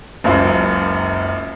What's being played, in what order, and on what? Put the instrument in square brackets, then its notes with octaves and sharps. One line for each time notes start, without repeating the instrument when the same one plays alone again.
[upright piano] F#1 C#2 F#2 F5